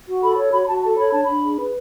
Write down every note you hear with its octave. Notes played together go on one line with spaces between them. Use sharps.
F#4
A4 B5
C#5
F#4 B5
B5
F#4 A5
A4 A5
C#5 B5
D4 A5
D4 B5
G#4
B4